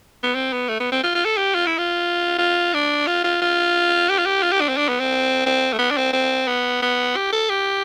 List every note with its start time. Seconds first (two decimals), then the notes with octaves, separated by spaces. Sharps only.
0.23 B3
0.35 C4
0.53 B3
0.68 A3
0.80 B3
0.92 C4
1.03 F4
1.15 F4
1.25 A4
1.37 G4
1.54 F4
1.66 E4
1.78 F4
2.38 F4
2.74 D4
3.07 F4
3.24 F4
3.42 F4
4.10 G4
4.18 F4
4.26 G4
4.43 F4
4.52 G4
4.61 D4
4.68 C4
4.77 D4
4.88 B3
5.00 C4
5.46 C4
5.72 A3
5.79 B3
5.90 D4
5.97 C4
6.13 C4
6.47 B3
6.82 B3
7.16 G4
7.32 A4
7.49 G4